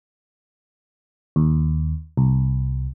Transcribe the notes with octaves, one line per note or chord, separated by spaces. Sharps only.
D#2
C2